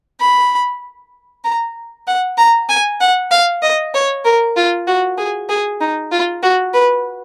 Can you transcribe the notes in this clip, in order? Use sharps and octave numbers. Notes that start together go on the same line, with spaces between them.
B5
A#5
F#5
A#5
G#5
F#5
F5
D#5
C#5
A#4
F4
F#4
G#4
G#4
D#4
F4
F#4
B4